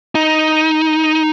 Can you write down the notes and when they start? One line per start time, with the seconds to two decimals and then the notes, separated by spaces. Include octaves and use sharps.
0.15 D#4